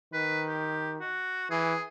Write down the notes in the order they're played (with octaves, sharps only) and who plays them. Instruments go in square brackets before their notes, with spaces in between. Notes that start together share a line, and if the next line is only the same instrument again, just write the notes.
[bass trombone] D#3 [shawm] B4
[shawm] G4
F#4
[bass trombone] E3 [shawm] G#4